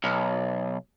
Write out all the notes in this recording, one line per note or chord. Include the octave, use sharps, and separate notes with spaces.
B1